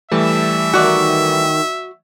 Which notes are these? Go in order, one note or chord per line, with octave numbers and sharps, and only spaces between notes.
E3 G3 A3 E5 A5
D#3 F#4 D5